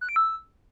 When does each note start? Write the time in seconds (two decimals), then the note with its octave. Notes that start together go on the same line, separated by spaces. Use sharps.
0.01 F#6
0.09 D7
0.16 E6